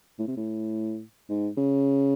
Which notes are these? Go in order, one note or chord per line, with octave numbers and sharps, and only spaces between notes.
A2
C3
A2
G#2
C#3